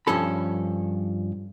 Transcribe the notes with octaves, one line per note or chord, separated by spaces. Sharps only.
G2 F3 C#4 A4 B5